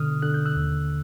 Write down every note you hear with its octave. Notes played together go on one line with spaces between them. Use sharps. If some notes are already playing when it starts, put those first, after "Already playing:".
Already playing: B2 D3 D#6 F6
D3 F#6
G6
E6 F#6
D#2